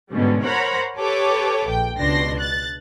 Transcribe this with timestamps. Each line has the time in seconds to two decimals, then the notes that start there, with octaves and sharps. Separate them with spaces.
0.11 G#2 B2 D3 G3 C#4
0.42 A#4 C5 C#5 F#5 A#5 B5
0.98 G4 A4 B4 C#5 D6
1.68 A#1 G5
1.97 C#2 B2 D4 C6 A#6
2.39 F#6 A6